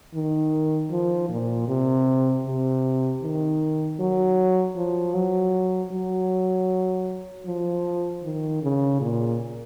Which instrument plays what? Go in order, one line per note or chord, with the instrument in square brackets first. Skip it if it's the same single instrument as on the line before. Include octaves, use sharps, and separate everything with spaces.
[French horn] D#3
F3
A#2
C3
C3
D#3
F#3
F3
F#3
F#3
F3
D#3
C#3
A#2